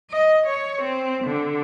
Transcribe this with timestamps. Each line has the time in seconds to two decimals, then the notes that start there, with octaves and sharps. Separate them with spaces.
0.10 D#5
0.47 C#5
0.82 C4
1.24 D3